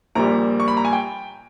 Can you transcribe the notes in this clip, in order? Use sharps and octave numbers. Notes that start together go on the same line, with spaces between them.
A#1 A#2 G3 A#5
C#6
B5
A#5
G#5
G5